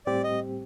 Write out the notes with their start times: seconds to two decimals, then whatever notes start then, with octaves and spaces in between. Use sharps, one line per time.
0.06 A2 G3 C4 G4 D5
0.24 D#5